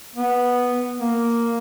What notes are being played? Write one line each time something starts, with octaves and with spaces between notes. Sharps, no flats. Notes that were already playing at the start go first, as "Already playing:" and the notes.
B3
A#3